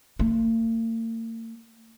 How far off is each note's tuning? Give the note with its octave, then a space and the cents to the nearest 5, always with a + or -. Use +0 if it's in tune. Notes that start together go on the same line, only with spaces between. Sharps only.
A#3 -45